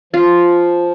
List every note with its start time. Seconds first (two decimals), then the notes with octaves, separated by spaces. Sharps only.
0.13 F3 F4